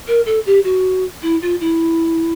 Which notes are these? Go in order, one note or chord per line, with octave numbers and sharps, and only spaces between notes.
A#4
A4
G4
F#4
E4
F4
E4